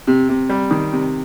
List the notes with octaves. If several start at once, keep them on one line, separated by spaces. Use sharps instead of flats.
C3
C3
G3
D#3
C3